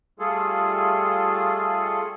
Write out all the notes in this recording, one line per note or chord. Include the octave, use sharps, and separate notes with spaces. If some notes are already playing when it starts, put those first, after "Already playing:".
G3 A3 F4 G#4 A4